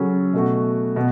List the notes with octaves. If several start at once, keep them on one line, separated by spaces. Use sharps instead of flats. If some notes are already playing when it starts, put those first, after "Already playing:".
Already playing: C#3 F#3 C#4 A4
B2 A3 F#4
B2